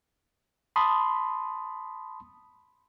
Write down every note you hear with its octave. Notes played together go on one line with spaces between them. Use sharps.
A5 B5 C6 D#6